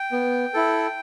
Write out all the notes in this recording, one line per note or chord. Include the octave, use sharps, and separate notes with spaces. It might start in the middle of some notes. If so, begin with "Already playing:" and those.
Already playing: G5
B3
E4 A4